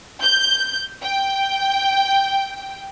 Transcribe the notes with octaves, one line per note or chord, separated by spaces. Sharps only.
G6
G5